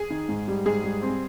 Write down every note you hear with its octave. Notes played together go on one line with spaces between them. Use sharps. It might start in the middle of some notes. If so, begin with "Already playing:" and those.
Already playing: G#4
D#3
G#2
G3
G#2 G#4
G3
C4